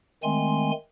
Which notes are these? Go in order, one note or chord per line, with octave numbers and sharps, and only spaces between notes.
D#3 G#3 A3 C4 G#5 C6